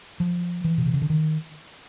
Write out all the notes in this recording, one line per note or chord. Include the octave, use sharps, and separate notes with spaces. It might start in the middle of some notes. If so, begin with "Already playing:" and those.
F3
E3
B2
C3
C#3
D3
D#3